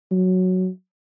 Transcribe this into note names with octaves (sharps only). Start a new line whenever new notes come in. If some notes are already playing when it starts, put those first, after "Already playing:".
F#3